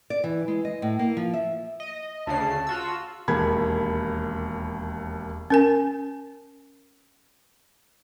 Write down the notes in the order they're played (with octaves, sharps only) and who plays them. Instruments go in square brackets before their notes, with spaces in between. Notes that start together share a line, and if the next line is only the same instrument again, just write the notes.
[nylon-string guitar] D5
E3
G#3
D#5
A2
A#3
F3
E5
[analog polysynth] D#5
[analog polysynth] D2 C#3 C7 [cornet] A5
[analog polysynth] F4 F#4 E6
[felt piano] E1 D#2 A#3 B5 G#6
[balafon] C#4 A#4 G#5